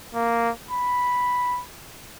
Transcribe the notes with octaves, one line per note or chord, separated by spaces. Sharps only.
A#3
B5